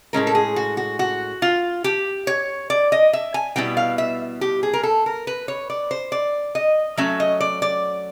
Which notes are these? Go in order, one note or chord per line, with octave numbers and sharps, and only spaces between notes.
A2 F3 G#3 C#4 A#4
A4
G#4
F#4
F#4
F#4
F4
G4
C#5
D5
D#5
E5
G#5
B2 G3 B3 E4 G5
F5
E5
G4
G#4
A#4
A4
A#4
B4
C#5
D5
C5
D5
D#5
F#3 A3 C#4 E5
D#5
D5
D5